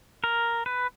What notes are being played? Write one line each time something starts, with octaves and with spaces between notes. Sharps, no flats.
A#4
B4